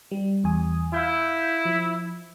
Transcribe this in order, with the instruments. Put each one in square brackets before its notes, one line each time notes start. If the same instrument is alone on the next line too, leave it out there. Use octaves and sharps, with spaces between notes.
[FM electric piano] G3
E2 G#5 D#6
[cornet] E4 [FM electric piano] F5 G6
[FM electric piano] F3